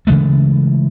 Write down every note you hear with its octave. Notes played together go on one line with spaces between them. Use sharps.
C#3 E3 G#3 A3